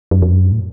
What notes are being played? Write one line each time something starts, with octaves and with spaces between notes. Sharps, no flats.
F#2
F2
F#2
A2